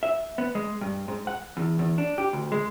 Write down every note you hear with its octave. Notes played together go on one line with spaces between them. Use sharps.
E5
B3
G#3
G2
G#2
F#5
E2
E2
D4
G4
D2
G#3